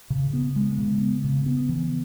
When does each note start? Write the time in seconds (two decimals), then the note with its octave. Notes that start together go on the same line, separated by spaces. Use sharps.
0.10 C#3
0.33 B3
0.56 G#3
0.78 C#3
1.01 B3
1.24 C#3
1.46 B3
1.69 E3